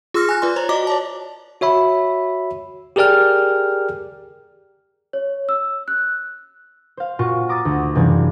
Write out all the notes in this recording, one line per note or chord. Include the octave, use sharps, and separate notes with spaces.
F4 G#4 C6 E6 F6 A#6
G#5 F#6
F4 B4 D5 C6
C5 C#5 A#5
F#4 D5 D#5 A#5 D6
C#5 D5 A5
F#4 C#5 E5 B5
G4 G#4 A#4 D5 G5 F6
C#5
E6
F#6
C5 F5
A#2 F4 F#4 C#6
A#5 D6 D#6 A6
D2
F#1 C3 E3 G3 D5 G#6